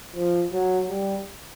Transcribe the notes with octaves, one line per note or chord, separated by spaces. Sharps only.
F3
F#3
G3